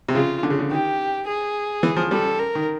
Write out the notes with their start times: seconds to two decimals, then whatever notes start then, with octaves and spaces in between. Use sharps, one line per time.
0.08 C3
0.15 C#3 F4
0.43 D3
0.50 C#3
0.59 D3
0.71 D#3 G4
1.27 G#4
1.83 E3
1.96 F3
2.11 G3 A4
2.39 A#4
2.55 D#3